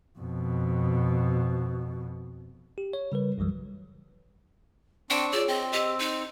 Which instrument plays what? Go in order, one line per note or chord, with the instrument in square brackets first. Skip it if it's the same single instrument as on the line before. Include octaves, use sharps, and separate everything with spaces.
[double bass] F2 B2
[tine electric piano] G4
C#5
C#3 G3 A#4 B4
B1 F#2 E3 F#3 G3
[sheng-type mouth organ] C4 D4 C#6 [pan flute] G5 [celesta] E7
[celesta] F4 G#4 C#5 [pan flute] D5 [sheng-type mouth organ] D6 E6
[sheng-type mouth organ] C4 [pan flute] D#5 [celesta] G5
[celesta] G5
[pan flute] G4 [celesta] D#5 E6 D#7
[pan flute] D#4 [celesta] D#7